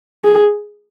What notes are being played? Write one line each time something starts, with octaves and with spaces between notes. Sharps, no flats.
G#4